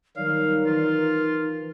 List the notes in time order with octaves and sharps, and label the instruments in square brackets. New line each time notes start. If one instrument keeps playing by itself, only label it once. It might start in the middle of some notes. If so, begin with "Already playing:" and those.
[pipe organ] D#3 F#3 G3 [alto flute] D#4 [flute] A#4 [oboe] F5
[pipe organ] E3 [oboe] F4